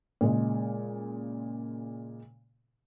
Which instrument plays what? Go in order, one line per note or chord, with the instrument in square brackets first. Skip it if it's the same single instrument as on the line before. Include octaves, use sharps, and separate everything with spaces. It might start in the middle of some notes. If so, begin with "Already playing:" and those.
[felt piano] A#2 C#3 G#3